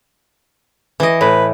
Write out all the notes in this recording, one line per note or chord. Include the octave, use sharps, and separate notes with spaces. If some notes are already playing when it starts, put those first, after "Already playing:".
E3 D#5
A2 B4